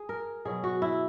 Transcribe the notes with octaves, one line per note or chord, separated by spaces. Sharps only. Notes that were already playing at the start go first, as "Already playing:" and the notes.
Already playing: G#4
A#4
B2 F#3 G#4
F#4
E4